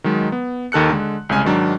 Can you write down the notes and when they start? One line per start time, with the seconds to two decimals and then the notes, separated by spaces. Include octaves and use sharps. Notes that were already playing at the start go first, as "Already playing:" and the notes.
0.04 D#3 F#3 G#3
0.32 B3
0.72 D#2 D#3 A4 F#6 C#7
0.90 D3 G#3
1.29 C2 C#3 G#3 G#5 F6
1.45 G#2 D#3 F#3 D4